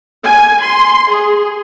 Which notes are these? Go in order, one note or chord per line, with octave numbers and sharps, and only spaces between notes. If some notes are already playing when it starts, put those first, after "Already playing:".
G#5
C6
G#4